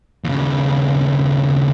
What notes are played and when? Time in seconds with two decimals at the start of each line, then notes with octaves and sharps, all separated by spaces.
0.24 D#2 C#3